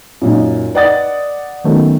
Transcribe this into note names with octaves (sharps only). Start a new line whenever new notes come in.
F#2 A#2 D#4
B4 D5 D#5 F#5 D#6 A6
D#3 F#3 A3 B3 C#4